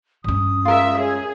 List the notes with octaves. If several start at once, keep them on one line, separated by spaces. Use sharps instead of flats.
G2 C#4 D#6
G#3 F4 A#4 E5
G#4 C#5